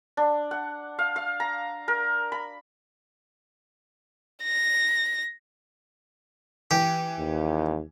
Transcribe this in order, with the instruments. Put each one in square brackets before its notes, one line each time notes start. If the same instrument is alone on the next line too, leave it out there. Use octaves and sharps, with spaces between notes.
[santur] D4
F#5
F5
F5
A#5
A#4
B5
[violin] A#6
[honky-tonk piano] E3 [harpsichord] G4
[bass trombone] D#2